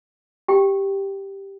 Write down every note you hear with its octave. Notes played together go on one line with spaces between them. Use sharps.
G4 G5